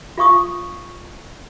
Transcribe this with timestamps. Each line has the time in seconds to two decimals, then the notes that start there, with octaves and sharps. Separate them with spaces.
0.18 F4 F5 C#6 D#6